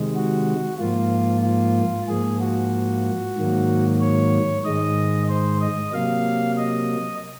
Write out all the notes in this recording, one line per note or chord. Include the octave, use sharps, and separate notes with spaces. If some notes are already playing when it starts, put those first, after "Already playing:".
Already playing: C3 D#3 G#3
F#4
G#2 F3 A#3 F4
F4
G#2 F3 A#3 G#4
F#4
G#2 D#3 F#3 A#3
C#5
G#2 D#3 G#3 D#5
C5
D#5
C3 F#3 A#3 F5
D#5